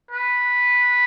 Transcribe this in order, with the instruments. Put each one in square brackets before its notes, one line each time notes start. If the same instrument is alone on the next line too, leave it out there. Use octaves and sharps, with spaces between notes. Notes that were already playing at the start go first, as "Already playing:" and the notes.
[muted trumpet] B4